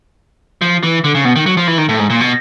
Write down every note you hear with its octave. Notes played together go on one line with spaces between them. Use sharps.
F3
E3
D3
C#3
B2
D#3
F#3
F3
E3
D#3
A2
G#2
A#2
B2